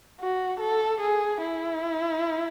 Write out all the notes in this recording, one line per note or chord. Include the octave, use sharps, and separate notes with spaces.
F#4
A4
G#4
E4